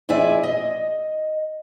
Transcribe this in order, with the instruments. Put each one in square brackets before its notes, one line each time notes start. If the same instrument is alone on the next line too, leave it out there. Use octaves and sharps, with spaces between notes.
[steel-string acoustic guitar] F2 E4 G#4 D5 E5 G#5
D#5